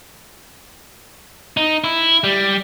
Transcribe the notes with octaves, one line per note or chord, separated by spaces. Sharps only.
D#4
E4
G3